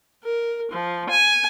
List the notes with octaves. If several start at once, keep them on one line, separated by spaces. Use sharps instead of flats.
A#4
F3
G#5